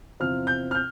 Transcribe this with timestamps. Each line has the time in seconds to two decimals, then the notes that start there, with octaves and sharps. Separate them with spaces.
0.20 E2 C3 F3 C4 F6
0.47 G6
0.71 F6
0.75 G6